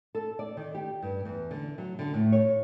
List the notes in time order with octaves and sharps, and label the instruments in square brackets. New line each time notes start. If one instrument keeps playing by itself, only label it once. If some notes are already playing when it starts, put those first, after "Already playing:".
[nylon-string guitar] A4
D5
D#3
G4
G2
E2
D3
F#3
D3
A2
C#5